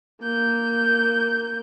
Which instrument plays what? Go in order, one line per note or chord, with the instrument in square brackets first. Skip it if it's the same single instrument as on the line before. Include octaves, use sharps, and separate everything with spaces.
[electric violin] A#3 G6